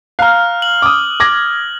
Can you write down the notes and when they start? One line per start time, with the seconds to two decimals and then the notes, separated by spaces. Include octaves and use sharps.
0.19 F5 A#5 F6 F#6
0.62 F#7
0.82 D6 D#6
1.20 D6 G#6 A#6